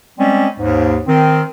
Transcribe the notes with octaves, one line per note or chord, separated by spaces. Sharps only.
G3 G#3 C4 C#4
D#2 G#2
D#3 C4